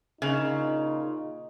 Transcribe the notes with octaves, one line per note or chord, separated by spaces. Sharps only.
A#2 C#3 D#4 F4